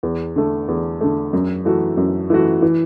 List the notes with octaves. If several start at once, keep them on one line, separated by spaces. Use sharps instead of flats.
E2
D3 A3
E2
D3 A3
F#2
E3 A3 F#4
F#2
E3 A3 F#4
E3